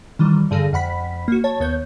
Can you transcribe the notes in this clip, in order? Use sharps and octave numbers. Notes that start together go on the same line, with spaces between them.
D#3 E3 G3
G2 D3 G#4 A4 F5 A#6
F2 F#5 B5 B6
A#3 F#4
C#5 A5 A6
D#2 B3 C#5 G6